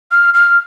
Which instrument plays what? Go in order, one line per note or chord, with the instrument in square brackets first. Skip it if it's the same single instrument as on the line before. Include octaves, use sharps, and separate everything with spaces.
[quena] F6
F6